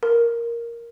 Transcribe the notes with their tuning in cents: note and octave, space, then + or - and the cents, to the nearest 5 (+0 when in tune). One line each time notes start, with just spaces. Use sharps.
A#4 +5